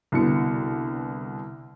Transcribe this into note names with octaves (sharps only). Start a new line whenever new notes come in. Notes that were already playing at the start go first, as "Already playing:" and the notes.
C2 B2 D3 B3 C#7